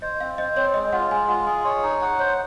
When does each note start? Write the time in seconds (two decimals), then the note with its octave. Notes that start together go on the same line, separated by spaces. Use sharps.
0.02 C5 D#5
0.20 C4 F5
0.38 C5 D#5
0.56 C4 C#5
0.74 G#3 D#5
0.93 F4 F#5
1.11 G#3 G#5
1.28 F4 F#5
1.46 G#4 G#5
1.65 C#5 D#5
1.83 D#4
2.02 F#5
2.19 C5 C#5